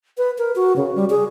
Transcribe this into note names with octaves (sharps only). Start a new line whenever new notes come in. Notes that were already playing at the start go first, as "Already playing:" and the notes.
B4
A#4
F#4
C#3
G3
G#4